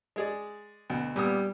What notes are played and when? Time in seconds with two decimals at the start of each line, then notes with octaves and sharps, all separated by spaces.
0.16 G#3 G#4 D5
0.90 D2 B2
1.16 A#2 G3 B3 D#6